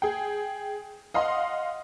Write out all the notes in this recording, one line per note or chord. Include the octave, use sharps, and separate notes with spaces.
G#4 G5
D#5 F5 F#5 C6